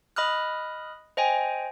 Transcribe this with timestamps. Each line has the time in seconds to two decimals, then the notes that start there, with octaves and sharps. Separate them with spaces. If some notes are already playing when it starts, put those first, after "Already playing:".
0.16 D#5 B5 D#6 F6 F#6
1.17 C5 D#5 G5 G#5